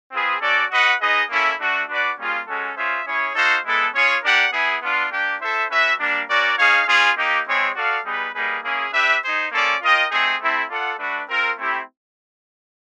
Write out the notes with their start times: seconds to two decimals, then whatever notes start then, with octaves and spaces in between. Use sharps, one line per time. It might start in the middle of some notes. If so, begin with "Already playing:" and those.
0.12 C4 F4 G#4 B4
0.41 C#4 F#4 A4 D5
0.70 F#4 B4 D#5 F#5
1.00 D#4 G#4 B4 D#5
1.30 A#3 C#4 E4 A4
1.59 A3 D4 F#4
1.88 D4 F#4 B4 D5 F#5
2.18 G3 A#3 C#4 F4 G#4
2.47 G#3 C#4 F#4 A4
2.76 C#4 F4 G#4 C5 E5
3.06 C#4 E4 G#4 C#5
3.35 D#4 F#4 A4 C5 F5
3.65 G#3 B3 E4 A4
3.94 C#4 F4 G#4 C#5
4.23 D4 G4 A#4 D5 F#5
4.53 B3 E4 G#4
4.82 B3 D4 F4
5.11 A#3 D4 G4
5.41 E4 A4 C5 E5
5.70 C#4 F#4 B4 E5
6.00 G3 A#3 D4
6.29 C#4 F#4 A#4 D5
6.58 D#4 G#4 C#5 F5
6.88 C#4 F4 G#4
7.17 A#3 D#4 G4
7.47 G#3 C4 E4 G#4 C#5
7.76 F#4 A4 D5 F5
8.05 G3 B3 D#4 G#4 B4
8.34 G3 A#3 D#4 G#4 B4
8.64 A#3 C#4 E4 G#4
8.93 D4 G4 B4 E5
9.23 D#4 G#4 C5
9.52 A#3 C#4 F4 A4 D5
9.81 F4 A#4 D#5 G5
10.11 A3 C4 D#4 G#4
10.40 A3 C4 E4 A4
10.70 F4 A4 D5 F#5
10.99 A3 D4 F#4 B4
11.29 C4 F4 A#4
11.58 A3 C4 E4 G4